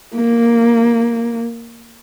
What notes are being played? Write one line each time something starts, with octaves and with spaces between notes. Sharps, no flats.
A#3